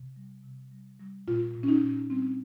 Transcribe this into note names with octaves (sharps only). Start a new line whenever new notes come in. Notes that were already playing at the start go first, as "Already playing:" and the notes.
Already playing: C3
G3
C3
G3
G3
A#2 F4
A#2
C#4
D#4
A#2
G3 C4